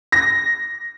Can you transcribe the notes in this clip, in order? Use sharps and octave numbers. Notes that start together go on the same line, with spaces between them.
A#6